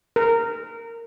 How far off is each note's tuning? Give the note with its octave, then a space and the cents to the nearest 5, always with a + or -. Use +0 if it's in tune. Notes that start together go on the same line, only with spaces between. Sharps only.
A#4 -15